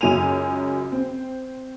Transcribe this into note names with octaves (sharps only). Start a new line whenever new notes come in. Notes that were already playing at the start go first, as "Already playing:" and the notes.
C#2 F#2 F#3 G#5 D#7 F7
C4